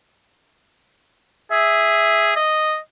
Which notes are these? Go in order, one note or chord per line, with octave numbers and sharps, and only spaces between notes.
G#4 E5
D#5